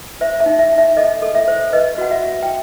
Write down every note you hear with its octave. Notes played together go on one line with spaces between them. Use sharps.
C5 E5
E5
D#4
E5
D#4
E5
A4 D#5
A4
E5
C5
B4 D#5
F#4 F#5
E5
F#4
G5